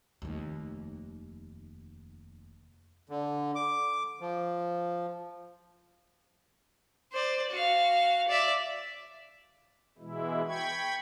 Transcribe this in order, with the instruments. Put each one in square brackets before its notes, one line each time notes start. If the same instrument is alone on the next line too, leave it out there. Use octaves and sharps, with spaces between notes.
[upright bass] F1 D#2
[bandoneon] D3
D6
F3
[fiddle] C5 D5
F#4 F5
D5 E5
[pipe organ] B2 E3 G#3 E4
G5 B5 C#6 G#6